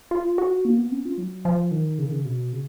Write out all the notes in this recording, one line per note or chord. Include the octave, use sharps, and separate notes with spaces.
F4
F#4
A#3
B3
C#4
F4
F#3
F3
D#3
C#3
D#3
C#3
B2
C#3